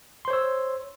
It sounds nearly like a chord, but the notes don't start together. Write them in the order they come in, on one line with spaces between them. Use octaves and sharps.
C6 C5 C#5 E6